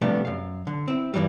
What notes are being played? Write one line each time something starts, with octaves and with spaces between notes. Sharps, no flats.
C3 F3 G3 A3 B3 D4
F#2 F5
D3
C4 E4
G2 A#2 E3 F#3 G3